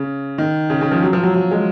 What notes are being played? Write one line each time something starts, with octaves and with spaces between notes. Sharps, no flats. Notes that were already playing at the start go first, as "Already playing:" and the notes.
Already playing: C#3
D#3
C#3
C#3
F3
F#3
F3
F#3
F#3
G#3